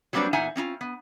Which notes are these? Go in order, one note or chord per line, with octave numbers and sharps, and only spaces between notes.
F#3 G3 A#3 C4 D4 B4
E2 A#2 D#4 E5 F#5 G#5
C4 C#4 D#4 F4
B3